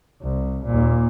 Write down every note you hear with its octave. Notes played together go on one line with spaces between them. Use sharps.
C2
D#2 A#2